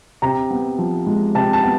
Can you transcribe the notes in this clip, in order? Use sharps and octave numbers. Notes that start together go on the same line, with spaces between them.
C3 A#5
B3
F3
G#3
C3 A5
A5
B3